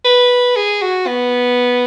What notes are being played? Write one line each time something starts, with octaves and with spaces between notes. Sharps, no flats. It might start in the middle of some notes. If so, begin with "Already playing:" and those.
B4
G#4
F#4
B3